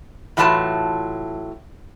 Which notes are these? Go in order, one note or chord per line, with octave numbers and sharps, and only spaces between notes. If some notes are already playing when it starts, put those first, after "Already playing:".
A2 E3 F#3 F4 E5 A5